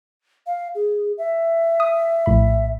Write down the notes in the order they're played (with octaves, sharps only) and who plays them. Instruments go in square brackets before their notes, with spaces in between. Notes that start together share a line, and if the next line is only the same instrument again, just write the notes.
[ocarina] F5
G#4
E5
[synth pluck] D#6
A#1 A2 B5